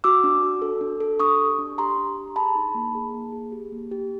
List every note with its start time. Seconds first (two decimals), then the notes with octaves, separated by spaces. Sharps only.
0.04 F#4 D6 E6
0.24 D4
0.42 F#4
0.62 A4
0.81 D4
1.00 A4
1.20 D4 C#6 D#6
1.40 G4
1.59 D4
1.78 G4 A#5 C6
1.98 D4
2.17 G4
2.36 G#4 A5 B5
2.55 D#4
2.75 A#3
2.95 G#4
3.14 A#3
3.32 G#4
3.52 G4
3.72 A#3
3.91 G4